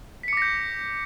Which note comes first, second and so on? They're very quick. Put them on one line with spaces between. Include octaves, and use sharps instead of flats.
B6 C#7 D6 A#6 G6